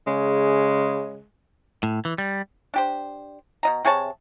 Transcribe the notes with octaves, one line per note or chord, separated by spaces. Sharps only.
C#3 G#3
A2
E3
G3
D4 G4 C5
B2 D#5 A#5
C3 G#4 C#5 A5